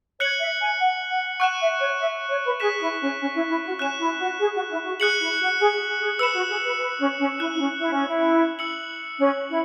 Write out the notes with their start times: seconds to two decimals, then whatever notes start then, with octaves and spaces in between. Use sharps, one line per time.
0.20 C#5 F#6 C#7 F#7
0.40 E5
0.60 G#5
0.79 F#5
1.10 F#5
1.40 F#5 C#6 F#6 E7
1.60 E5
1.79 C#5
2.00 E5
2.30 C#5
2.45 B4
2.60 G#4 F#6 B6 E7
2.80 E4
3.00 C#4
3.20 C#4
3.34 E4
3.49 E4
3.64 F#4
3.79 C#4 F#6 E7
3.99 E4
4.19 F#4
4.39 G#4
4.54 F#4
4.69 E4
4.84 F#4
4.99 G#4 F#6 C#7 F#7
5.19 E4
5.40 F#4
5.59 G#4
5.99 G#4
6.19 B4 E6 C#7 E7
6.34 F#4
6.49 G#4
6.64 B4
6.79 B4
6.99 C#4
7.19 C#4
7.39 E4 F#6 E7
7.54 E4
7.59 C#4
7.79 E4
7.92 C#4
8.06 E4
8.59 E6 C#7 F#7
9.19 C#4
9.49 E4